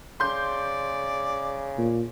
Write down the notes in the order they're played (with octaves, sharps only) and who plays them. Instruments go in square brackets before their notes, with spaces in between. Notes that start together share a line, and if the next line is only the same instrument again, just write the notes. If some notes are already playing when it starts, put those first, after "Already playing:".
[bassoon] C#3 [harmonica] D5 [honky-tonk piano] C6 G6
[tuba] A#2